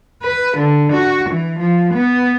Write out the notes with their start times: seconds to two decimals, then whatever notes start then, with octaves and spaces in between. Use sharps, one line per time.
0.22 B4
0.57 D3
0.92 F#4
1.30 E3
1.59 F3
1.94 B3